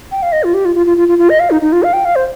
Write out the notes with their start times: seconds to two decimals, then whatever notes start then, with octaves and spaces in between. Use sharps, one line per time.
0.12 G5
0.22 F5
0.32 D#5
0.44 F4
0.54 G4
0.65 F4
0.75 F4
0.86 F4
0.97 F4
1.08 F4
1.18 F4
1.29 D#5
1.40 F5
1.51 D#4
1.62 D#4
1.72 F4
1.83 F5
1.93 G5
2.05 F5
2.16 C5